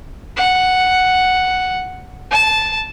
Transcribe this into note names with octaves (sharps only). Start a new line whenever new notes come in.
F#5
A5